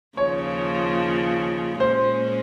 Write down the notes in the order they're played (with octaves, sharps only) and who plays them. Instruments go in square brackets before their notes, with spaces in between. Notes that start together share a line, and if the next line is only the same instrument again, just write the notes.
[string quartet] D#2 C#3 F3 [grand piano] C#5
[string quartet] A#2 G#3 C#4 [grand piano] C5